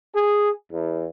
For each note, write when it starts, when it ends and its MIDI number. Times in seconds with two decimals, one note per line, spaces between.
0.15 0.51 68
0.73 1.07 40